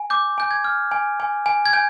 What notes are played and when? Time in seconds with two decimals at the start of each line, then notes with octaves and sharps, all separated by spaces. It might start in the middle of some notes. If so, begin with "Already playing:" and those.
Already playing: G#5
0.10 D6 G6
0.38 G#5 G6
0.51 G#6
0.64 F6
0.91 G#5
1.20 G#5
1.46 G#5
1.66 G#6
1.73 G#5 G6